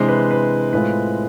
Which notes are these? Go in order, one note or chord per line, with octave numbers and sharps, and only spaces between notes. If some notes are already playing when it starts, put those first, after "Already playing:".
Already playing: C3 E3 G#3 D4 C5
B4
B4
A2 G#3 C4 F4 B4